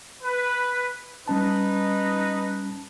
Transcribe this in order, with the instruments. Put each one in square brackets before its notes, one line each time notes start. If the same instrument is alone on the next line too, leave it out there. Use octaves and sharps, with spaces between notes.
[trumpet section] B4
[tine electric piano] G3 C#4 A5 [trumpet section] D#4 B4